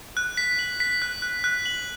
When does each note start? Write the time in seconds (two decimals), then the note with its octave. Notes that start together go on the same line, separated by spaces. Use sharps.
0.17 F#6
0.37 B6
0.59 F#7
0.80 B6
1.02 F#6
1.22 F#6
1.44 F#6
1.66 F#7